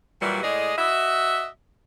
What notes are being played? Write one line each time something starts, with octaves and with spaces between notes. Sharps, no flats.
A#2 E3 F#3 G3
A2 G#3 G#4 D5 D#5
F#4 D#5 E5